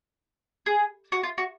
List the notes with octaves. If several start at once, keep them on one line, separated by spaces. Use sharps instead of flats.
G#4
F#4
F4
F#4